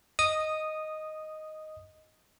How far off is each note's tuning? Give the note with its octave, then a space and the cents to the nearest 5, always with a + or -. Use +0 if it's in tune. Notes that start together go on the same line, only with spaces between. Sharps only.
D#5 +0 D#6 -10